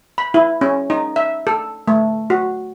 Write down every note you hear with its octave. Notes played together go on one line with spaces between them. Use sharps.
B5
E4
C#4
D#4
E5
A4
A3
F#4